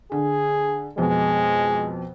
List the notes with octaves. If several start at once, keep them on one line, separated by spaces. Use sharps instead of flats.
D3 G#4
F2 B2 G#3